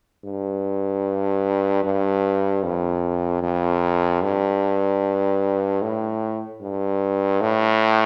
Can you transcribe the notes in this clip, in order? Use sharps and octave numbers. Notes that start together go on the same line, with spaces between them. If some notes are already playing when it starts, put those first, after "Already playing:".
G2
G2
F2
F2
G2
A2
G2
A2